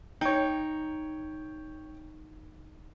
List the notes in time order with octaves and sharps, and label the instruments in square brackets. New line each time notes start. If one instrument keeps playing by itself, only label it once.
[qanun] D#4 [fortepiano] C#5 G5